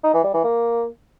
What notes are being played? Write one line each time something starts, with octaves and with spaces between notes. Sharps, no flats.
D#4
E3
G3
E3
A#3